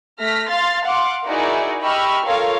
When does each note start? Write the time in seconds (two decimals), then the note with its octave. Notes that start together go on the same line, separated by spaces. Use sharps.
0.19 A3 F6 A#6 B6
0.49 F5 C6 F6 A6
0.84 F5 F#5 C6 D6
1.25 D#4 E4 F#4 G#4 A#4 D5
1.81 G4 D#5 B5 C#6 E6 F6
2.25 F4 A4 A#4 C#5 F5